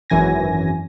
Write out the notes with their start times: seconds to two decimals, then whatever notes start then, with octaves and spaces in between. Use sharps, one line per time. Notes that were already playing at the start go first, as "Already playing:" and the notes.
0.10 G#1 F#2 E3 G#5 A#6